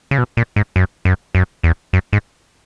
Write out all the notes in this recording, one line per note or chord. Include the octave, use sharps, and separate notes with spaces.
C#3
B2
A#2
G#2
F#2
F#2
F#2
E2
F#2
G#2